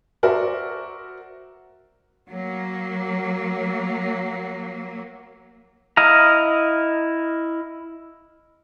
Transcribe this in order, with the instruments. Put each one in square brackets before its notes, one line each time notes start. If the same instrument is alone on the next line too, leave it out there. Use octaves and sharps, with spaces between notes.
[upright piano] F#4 A#4 C5 D5 E5
[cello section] F#3 A#3
[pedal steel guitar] E4 D#5 F5 A#5